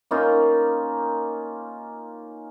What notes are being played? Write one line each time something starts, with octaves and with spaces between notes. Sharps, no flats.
A#3 C#4 D#4 F4